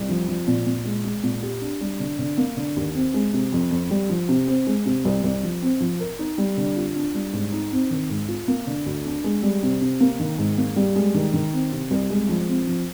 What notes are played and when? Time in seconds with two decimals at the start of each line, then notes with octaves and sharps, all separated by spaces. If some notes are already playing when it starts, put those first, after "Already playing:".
Already playing: C2
0.09 F3
0.28 F3
0.47 A#2
0.66 A#2
0.85 G#3
1.05 G#3
1.23 A#2
1.43 G4
1.62 D4
1.81 G3
2.00 D3
2.19 D3
2.38 A#3
2.57 D3
2.76 D#2
2.95 C4
3.14 G#3
3.33 C3
3.52 F2
3.71 F2
3.90 G3
4.09 F3
4.29 C3
4.47 C4
4.67 G#3
4.86 C3
5.05 C2
5.23 C2
5.43 F3
5.62 C4
5.80 F3
6.00 A#4
6.19 D#4
6.38 G3
6.57 D3
6.77 F4
6.96 D4
7.14 G3
7.33 G#2
7.52 D#4
7.72 C4
7.91 D#3
8.10 G#2
8.28 F4
8.48 A#3
8.67 D3
8.86 D2
9.05 D4
9.24 G#3
9.43 G3
9.63 C3
9.81 C3
10.00 A#3
10.19 D#3
10.38 G#2
10.58 A#3
10.76 G3
10.96 G#3
11.14 D#3
11.34 D#3
11.53 C4
11.72 C3
11.91 C2
12.10 G#3
12.29 F3
12.48 C4
12.67 F3